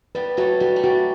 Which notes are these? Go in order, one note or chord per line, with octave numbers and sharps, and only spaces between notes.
G3 B3 B4
F#3 A3 F#4
G3 F#4
A3
G3 F#4